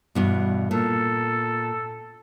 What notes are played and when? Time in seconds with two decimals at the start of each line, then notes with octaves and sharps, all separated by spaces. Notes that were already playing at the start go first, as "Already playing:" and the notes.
0.15 E2 G2 B2
0.71 A#2 A4